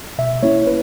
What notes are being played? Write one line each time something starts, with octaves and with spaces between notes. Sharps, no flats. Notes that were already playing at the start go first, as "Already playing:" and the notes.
B2 E5
A#3 C#4 E4 C#5
B4